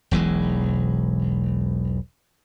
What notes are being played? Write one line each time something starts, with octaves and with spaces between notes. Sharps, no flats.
E1 B1 E3 G#3